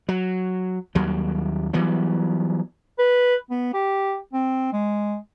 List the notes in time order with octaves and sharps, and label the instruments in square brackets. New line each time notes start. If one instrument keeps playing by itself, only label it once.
[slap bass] F#3
D#2 F#3 G3
E3 F#3 G3 B3
[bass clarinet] B4
B3
G4
C4
G#3